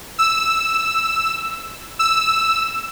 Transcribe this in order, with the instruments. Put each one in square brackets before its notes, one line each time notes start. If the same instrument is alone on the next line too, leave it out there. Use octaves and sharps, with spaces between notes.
[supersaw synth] E6
E6